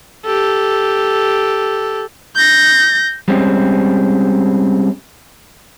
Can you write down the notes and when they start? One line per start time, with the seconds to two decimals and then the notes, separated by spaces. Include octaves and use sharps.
0.25 G4 A4
2.36 G6 A#6
3.28 G3 G#3 C4 C#4